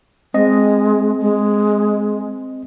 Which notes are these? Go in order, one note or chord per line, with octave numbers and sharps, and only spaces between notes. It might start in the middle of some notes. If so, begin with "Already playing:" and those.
G#3 C4 D#5
G#3